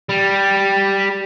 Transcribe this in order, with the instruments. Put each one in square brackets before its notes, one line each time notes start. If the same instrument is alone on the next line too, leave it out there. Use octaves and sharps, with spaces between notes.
[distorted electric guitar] G3